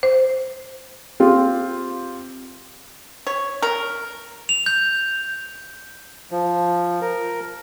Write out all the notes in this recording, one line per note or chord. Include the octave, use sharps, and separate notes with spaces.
C5
C4 F4 G4
C#5
A#4
F7
G6
F3
A#4